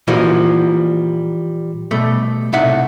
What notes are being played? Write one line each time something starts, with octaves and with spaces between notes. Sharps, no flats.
A#2 E3 F3 G3 A#3 F#4
B2 G3 A3
C2 A2 D#4 E5 F#5